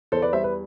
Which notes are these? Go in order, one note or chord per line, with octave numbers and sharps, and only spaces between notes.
E2 A4 C5
B4 D5
G3 C5 E5
B4